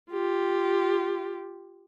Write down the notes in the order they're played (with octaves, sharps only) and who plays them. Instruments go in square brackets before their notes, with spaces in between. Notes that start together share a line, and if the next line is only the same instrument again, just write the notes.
[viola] F4 G4